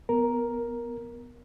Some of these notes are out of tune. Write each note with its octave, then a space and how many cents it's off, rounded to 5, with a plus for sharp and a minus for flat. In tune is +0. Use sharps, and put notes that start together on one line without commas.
B3 +0 A#4 +5